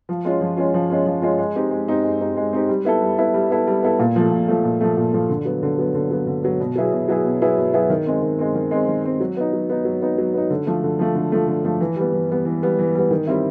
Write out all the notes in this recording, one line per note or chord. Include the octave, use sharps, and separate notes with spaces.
F3
G#3 C#4 F4
F3
G#3 C#4 F4
F3
G#3 C#4 F4
F3
G#3 C#4 F4
G#3
C4 D#4 G4
G#3
C4 D#4 G4
G#3
C4 D#4 G4
G#3
C4 D#4 G4
G3
B3 E4 A4
G3
B3 E4 A4
G3
B3 E4 A4
G3
B3 E4 A4
A#2
F3 A3
A#2
F3 A3
A#2
F3 A3
A#2
F3 A3
D3
F#3 B3
D3
F#3 B3
D3
F#3 B3
D3
F#3 B3
B2
F#3 B3 E4 G#4
B2
F#3 B3 E4 G#4
B2
F#3 B3 E4 G#4
B2
F#3 B3 E4 G#4
D#3
G#3 C4
D#3
G#3 C4
D#3
G#3 C4
D#3
G#3 C4
F#3
B3 D#4
F#3
B3 D#4
F#3
B3 D#4
F#3
B3 D#4
D3
F3 A3
D3
F3 A3
D3
F3 A3
D3
F3 A3
E3
G3 B3
E3
G3 B3
E3
G3 B3
E3
G3 B3
D#3
G3 C4 E4